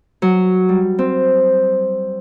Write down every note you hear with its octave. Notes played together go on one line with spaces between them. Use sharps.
F#3
G3
C4